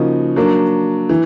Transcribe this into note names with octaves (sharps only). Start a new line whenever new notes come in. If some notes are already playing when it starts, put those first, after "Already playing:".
Already playing: C#3 F3 A#3 D#4 F#4
F#3 A#3 D4
E3